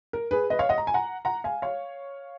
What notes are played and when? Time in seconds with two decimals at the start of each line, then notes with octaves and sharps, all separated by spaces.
0.13 A#4
0.31 G#4 B4
0.50 B4 D#5
0.59 C#5 F5
0.69 D#5 F#5
0.78 A#5
0.87 G#5
0.94 F#5 A#5
1.25 F#5 A#5
1.44 F5 G#5
1.62 C#5 F5